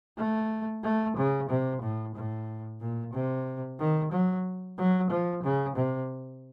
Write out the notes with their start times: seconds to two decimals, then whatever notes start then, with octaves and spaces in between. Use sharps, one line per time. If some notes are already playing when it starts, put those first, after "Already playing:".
0.18 A3
0.83 A3
1.17 C#3
1.49 C3
1.82 A2
2.15 A2
2.81 A#2
3.13 C3
3.79 D#3
4.12 F#3
4.78 F#3
5.10 F3
5.43 C#3
5.76 C3